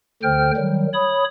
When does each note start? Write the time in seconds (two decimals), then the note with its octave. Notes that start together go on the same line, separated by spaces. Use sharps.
0.23 D2 D3 C5 G5 F6
0.57 D#3 F#3 G3
0.94 C#5 B5 D#6